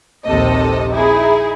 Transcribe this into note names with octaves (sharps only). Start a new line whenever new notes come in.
A#1 D#2 C3 A4 D#5
D#4 E4 G#4